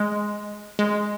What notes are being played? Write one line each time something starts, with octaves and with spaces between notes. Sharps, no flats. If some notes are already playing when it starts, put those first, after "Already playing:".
Already playing: G#3
G#3